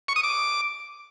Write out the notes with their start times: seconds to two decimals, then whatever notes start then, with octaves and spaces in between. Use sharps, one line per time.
0.08 C#6
0.16 D#6
0.23 D6